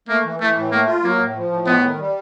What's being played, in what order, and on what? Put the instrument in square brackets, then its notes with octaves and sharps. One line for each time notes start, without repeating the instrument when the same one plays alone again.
[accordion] A3 [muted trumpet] A#3
[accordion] E3
[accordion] E3 [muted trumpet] A3
[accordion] A2
[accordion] A3 [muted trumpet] A#3
[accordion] F4
[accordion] F#3 [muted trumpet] A#3
[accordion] A2
F3
A2
[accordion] G#3 [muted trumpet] B3
[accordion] D#3
G3